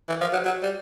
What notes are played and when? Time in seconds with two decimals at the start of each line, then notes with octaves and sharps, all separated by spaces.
0.08 E3
0.21 F3
0.33 F#3
0.45 F#3
0.63 G3